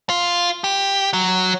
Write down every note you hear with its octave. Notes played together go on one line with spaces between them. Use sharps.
F4
G4
F#3